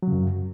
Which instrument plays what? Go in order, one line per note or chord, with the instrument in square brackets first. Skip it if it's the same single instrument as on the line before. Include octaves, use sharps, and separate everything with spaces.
[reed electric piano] F#3
C#3
F#2